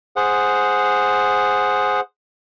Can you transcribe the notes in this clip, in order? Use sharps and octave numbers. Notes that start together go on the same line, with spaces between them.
G#4 C5 F#5